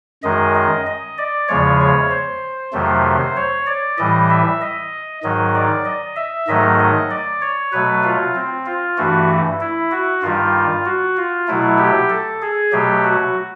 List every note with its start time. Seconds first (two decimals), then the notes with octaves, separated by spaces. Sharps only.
0.23 F#2 D#3 G#3 D#5
0.55 D#5
0.86 D#5
1.18 D5
1.48 E2 C#3 F3 G#3 C#5
1.80 C#5
2.10 C5
2.73 F2 C3 D#3 F#3 A3
3.36 C#5
3.66 D5
3.98 A2 E3 G3 D#5
4.30 E5
4.61 D#5
5.23 G#2 D#3 F#3 D#5
5.55 D5
5.85 D#5
6.16 E5
6.48 G#2 D#3 F#3 A3 D#5
6.79 D#5
7.10 D5
7.41 C#5
7.72 B2 F#3 A3 B4
8.04 F4
8.35 C4
8.66 F4
8.98 G2 E3 A3 F#4
9.61 E4
9.91 F#4
10.22 G2 D#3 G3 F4
10.86 F#4
11.17 F4
11.48 B2 F#3 A3 E4
11.78 G4
12.10 A4
12.42 G#4
12.72 B2 F#3 A3 G4
13.04 F#4